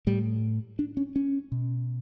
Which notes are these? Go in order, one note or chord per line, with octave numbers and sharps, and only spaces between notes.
A2 G3
D4
C#4
C#4
B2